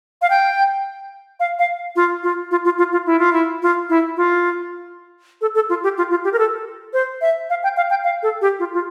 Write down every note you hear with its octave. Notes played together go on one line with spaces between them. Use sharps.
F5
G5
F5
F5
F4
F4
F4
F4
F4
F4
E4
F4
E4
F4
E4
F4
A4
A4
F4
G4
F4
F4
G4
A#4
A4
C5
E5
F5
G5
F5
G5
F5
A4
G4
F4
F4